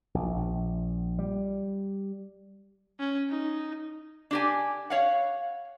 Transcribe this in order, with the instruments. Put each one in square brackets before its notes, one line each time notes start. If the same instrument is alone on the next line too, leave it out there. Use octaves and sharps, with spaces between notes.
[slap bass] A#1
A#1
G3
[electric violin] C#4
D#4
[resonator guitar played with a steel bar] D4 G4 G#5
C#5 F5 F#5